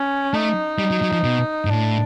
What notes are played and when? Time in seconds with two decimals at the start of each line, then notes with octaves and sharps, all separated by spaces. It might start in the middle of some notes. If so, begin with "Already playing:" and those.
Already playing: C#4
0.34 A3 D#4
0.79 G3
0.91 F#3
1.02 F#3
1.13 F3
1.24 B2
1.65 G#2
1.70 A2 D4